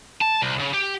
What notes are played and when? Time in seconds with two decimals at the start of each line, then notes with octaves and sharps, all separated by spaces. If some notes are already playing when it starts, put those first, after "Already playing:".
0.21 A5
0.42 C2
0.60 C#3
0.74 G4